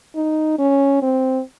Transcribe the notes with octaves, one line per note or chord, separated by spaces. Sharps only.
D#4
C#4
C4